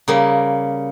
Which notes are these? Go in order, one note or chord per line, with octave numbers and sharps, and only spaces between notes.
C#3 G3 A#3